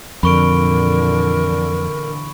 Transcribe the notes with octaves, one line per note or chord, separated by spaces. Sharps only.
F2 A#2 D3 E3 A#4 B5 C#6 D7